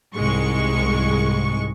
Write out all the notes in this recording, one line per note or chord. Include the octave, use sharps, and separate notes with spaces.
C2 G#2 G#3 C#6